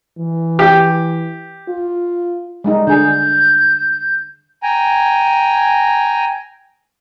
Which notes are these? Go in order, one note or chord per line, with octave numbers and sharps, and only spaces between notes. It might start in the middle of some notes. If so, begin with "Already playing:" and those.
E3
G4
F4
G3 G#3 D#4
D3 G#4 G6
G5 G#5 A#5